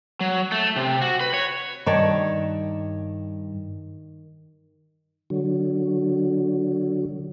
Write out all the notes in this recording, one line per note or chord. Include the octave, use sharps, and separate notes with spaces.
F#3
A3
C3
F#4
B4
C#5
G2 D#3 C#5 D5 A5
D3 F#3